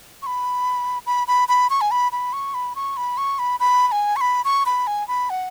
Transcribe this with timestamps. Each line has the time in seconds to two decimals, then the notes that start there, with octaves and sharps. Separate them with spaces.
0.22 C#6
0.26 B5
1.06 B5
1.28 B5
1.49 B5
1.70 C#6
1.81 G#5
1.91 B5
2.12 B5
2.33 C#6
2.54 B5
2.76 C#6
2.97 B5
3.17 C#6
3.39 B5
3.60 B5
3.88 B5
3.92 G#5
4.16 C#6
4.21 B5
4.45 C#6
4.66 B5
4.87 G#5
5.08 B5
5.30 F#5